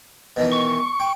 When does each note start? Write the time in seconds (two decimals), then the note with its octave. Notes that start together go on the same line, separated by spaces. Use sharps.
0.36 B2 D#3 E3
0.52 C#6
1.00 G5